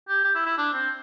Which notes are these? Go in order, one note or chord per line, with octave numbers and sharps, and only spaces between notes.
G4
G4
E4
E4
D4
C4